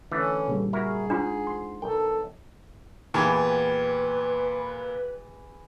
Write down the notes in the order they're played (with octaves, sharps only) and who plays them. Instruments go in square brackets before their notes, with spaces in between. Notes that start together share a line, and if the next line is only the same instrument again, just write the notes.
[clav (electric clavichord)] D3 E3 A3 [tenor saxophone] C#4
[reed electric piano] A#2 C#3 G3
[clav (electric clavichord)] E4 F#4 A#4 [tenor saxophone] G#4
[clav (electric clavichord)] G#2 [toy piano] D4 F4
[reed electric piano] C6
[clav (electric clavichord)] B1 G5 [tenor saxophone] A4 [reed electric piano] A#4
[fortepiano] E2 [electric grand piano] A#2 [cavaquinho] F#4 G4 G#5 [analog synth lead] B4